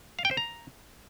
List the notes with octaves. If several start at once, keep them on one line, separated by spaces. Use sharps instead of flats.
F5
G5
C5
A#5